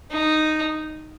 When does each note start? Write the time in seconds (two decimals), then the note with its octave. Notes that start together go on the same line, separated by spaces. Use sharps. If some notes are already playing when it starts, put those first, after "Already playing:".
0.12 D#4